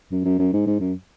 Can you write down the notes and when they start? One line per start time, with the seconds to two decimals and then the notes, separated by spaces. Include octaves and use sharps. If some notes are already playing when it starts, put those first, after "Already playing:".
0.12 F#2
0.25 F#2
0.39 F#2
0.53 G#2
0.67 G#2
0.80 F#2